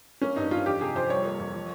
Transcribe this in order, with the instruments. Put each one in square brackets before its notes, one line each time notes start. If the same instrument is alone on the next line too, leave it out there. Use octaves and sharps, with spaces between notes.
[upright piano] A#3 C#4
G2 D#4
G2 F4
F2 G4
C3 G#4
F2 C5
G3 C#5
A#3
F2
F3